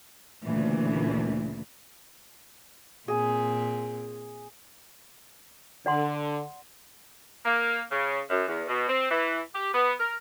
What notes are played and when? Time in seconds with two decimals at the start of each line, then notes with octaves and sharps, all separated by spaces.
0.45 D2 A#2 C#3 E3
3.08 A#2 C4 G#4
5.86 D3 D5 F#5 C6
7.45 A#3
7.92 C#3
8.30 F#2
8.48 E2
8.68 B2
8.89 C4
9.11 E3
9.55 G4
9.74 B3
10.00 A#4